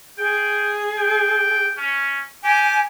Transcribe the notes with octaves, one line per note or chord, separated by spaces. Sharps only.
G#4 G5
G5
C#4
G4 G#5